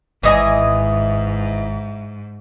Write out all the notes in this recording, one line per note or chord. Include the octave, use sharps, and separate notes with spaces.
G#1 G#2 E3 E4 D#5 G#5